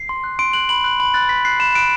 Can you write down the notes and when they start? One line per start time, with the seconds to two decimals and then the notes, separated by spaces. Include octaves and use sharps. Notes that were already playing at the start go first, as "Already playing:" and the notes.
Already playing: C7
0.09 C6
0.24 F#6
0.39 C6 D7
0.53 F#6 F#7
0.69 B5 F#7
0.84 F#6
1.00 B5 F#7
1.14 F#6 A6
1.29 B5 B6
1.45 F#6 C7
1.60 B5 E7
1.75 F#6 D7